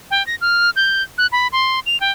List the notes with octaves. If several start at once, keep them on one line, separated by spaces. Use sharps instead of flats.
G5
A#6
F6
G6
F#6
B5
C6
F7
G5